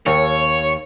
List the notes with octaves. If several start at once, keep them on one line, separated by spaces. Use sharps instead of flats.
D#2 C#5